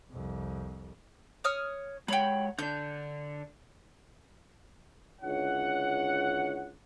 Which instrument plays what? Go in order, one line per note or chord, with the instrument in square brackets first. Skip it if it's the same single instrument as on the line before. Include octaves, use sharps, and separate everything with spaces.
[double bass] C2 F2
[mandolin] C#5 D#6 F6
[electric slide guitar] G#3 C#5 F#5 [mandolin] G5 B5
[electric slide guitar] D3 D4 [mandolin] G6
[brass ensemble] C#2 D3 E4 C#5 F#5